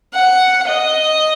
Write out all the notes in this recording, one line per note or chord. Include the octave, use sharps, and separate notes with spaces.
F#5
D#5